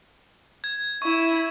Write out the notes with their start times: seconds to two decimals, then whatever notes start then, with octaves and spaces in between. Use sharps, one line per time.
0.64 G#6
1.02 E4 C#6